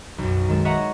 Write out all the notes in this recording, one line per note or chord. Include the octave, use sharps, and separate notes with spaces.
B1 F#2
D#3 G#3 A4
C#5 D#5 E5 F#5 A#5